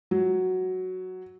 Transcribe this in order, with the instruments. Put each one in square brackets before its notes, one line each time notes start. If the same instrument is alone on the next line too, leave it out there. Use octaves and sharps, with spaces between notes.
[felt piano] F#3